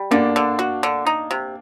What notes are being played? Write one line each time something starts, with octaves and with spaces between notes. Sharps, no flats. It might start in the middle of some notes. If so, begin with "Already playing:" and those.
Already playing: G3
D3 A#3 D4
D3
F#4
D3
D#4
C3